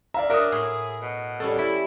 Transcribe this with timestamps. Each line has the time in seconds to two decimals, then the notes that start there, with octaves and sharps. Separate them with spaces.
0.14 D5 E5 F5 A#5
0.30 D4 F#4 G#4 A#4 C#5 D#6
0.52 A2 E4 G#4 C6
1.02 B2
1.40 G3 C#4 E4 A4
1.58 G3 E4